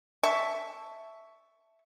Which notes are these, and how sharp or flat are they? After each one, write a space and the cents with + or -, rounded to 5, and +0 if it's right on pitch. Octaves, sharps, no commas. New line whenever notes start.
E5 +0 A5 +0 C#6 +10